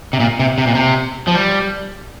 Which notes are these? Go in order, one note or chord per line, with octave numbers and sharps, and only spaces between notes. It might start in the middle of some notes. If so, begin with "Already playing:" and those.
C3
A#2
C3
C3
A#2
C3
F3
G3